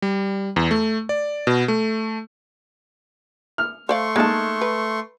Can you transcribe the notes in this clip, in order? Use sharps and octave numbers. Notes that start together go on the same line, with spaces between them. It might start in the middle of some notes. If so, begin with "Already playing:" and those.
G3
E2
A3
D5
B2
A3
F6
A3 C5 D5 F5 C6 C#6
G#3 A#3 D#4 A5
B4